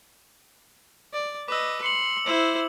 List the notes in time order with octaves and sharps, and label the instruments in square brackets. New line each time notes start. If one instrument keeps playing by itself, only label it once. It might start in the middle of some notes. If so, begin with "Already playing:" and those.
[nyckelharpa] D5
[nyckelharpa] B4 D#5 [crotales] D6 E6
[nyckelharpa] C6 [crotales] C#7 F#7
[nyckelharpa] E4 C5